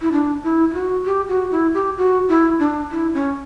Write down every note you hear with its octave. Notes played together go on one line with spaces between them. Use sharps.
E4
D4
E4
E4
F#4
G4
F#4
E4
G4
F#4
E4
D4
E4
C#4